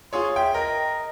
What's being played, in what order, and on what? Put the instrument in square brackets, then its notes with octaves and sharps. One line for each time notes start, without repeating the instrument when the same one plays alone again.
[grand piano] F4 G#4 C#5 [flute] C6
[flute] E5 [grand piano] G5
[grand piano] A#4 [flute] D#5